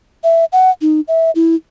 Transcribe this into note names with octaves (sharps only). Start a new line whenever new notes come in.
E5
F#5
D#4
E5
E4